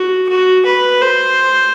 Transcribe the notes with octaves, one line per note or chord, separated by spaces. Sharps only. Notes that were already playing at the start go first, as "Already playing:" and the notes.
Already playing: F#4
F#4
B4
C5